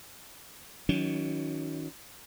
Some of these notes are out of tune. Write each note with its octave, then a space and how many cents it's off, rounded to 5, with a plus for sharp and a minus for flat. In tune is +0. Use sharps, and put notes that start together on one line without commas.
D#3 +30 F#3 +0 C#4 +30